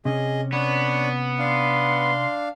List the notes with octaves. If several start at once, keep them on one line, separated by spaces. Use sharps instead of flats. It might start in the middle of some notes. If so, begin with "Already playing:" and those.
C3 C#4 G#4 D#5
B3 D4 C#5
D4 F5 C6